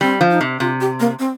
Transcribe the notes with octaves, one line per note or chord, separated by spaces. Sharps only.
G3 C4
F3
D#4
C3
C3 F4
G4
A#3
C4